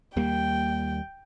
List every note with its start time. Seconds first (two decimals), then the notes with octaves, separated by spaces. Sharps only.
0.16 D#2 G3 A#3 G5